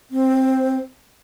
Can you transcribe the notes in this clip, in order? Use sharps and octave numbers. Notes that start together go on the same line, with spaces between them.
C4